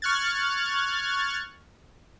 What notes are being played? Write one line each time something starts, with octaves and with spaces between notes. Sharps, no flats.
C#6 F6 F#6 G#6 A6